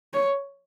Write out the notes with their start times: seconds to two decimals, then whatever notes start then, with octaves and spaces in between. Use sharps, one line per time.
0.14 C#5